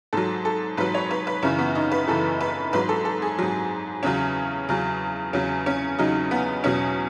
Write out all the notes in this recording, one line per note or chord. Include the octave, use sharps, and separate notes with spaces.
G#2 F#3 A4
A4
G#2 F#3 B4
C#5
B4
B4
F#2 C#3 E3 C#4
B3
D#4
B4
F#2 C#3 E3 A4
B4
G#2 F#3 B4
A4
A4
G#4
G#2 F#3
E2 C#3 F#3 C#4
E2 C#3 F#3
E2 C#3 F#3 C#4
C#4
E2 C#3 F#3 D#4
B3
E2 B2 F#3 C#4